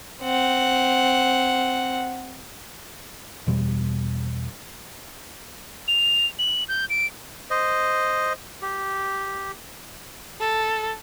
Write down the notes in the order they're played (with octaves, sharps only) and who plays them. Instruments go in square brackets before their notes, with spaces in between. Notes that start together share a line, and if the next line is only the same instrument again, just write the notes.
[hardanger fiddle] C4 F#5
[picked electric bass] E2 B2 G3
[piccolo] F7
F#7
G6
D7
[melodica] C5 D#5
G4
[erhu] A4